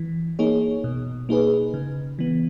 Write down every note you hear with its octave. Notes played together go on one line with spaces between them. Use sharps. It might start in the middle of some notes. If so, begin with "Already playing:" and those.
Already playing: E3
A#3 D#4 G#4 C#5
B2
A#3 D#4 G#4 B4
C#3
E3 B3